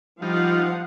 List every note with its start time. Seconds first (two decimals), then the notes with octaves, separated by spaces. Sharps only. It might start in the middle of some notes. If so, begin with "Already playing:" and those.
0.22 F3 G3 D#4 F4 F5 F#5